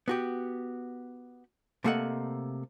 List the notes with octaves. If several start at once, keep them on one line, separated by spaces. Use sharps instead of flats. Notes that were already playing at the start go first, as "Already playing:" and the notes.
B3 F#4 G4
C3 A3 A#3 A4 D#5 F#5